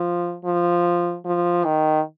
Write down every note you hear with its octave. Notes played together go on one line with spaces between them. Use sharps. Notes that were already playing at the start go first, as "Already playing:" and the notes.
Already playing: F3
F3
F3
D#3